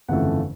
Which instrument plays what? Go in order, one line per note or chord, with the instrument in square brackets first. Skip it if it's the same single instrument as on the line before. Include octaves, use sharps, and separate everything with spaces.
[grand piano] G1 F2 C#3 E3 A3 F#5